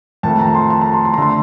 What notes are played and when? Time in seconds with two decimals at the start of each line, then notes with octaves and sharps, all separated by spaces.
0.23 F2 D#3 A3 A5
0.39 A#5
0.55 C6
0.70 A5
0.82 A#5
0.94 C6
1.05 C6
1.14 A#5
1.18 D3 A3 C6